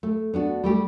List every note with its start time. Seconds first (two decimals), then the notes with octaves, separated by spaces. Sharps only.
0.03 A3
0.34 B3 D4 F#4
0.64 G3 A3 G4